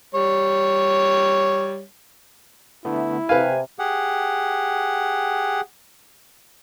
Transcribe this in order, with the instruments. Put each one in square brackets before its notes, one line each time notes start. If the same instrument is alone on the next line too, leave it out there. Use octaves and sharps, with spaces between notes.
[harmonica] G3 C#5
[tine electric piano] D3 A3 B3 [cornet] E4
[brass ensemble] C3 [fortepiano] B4 F5 [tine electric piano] G#5
[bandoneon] G4 G#4 F#5